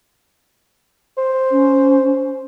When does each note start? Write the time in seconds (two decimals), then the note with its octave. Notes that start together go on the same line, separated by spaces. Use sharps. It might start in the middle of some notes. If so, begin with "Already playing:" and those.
1.18 C5
1.51 C#4